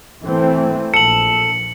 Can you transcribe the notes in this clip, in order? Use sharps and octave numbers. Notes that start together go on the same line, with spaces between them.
E3 A3 C4
A#1 A4 C#7 F#7